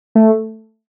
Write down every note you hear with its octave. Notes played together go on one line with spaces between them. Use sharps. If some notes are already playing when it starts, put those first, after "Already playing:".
A3